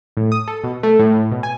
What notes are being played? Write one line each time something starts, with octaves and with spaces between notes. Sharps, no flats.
A2
D#6
A4
B2
A3
A2
A2
B2
G#5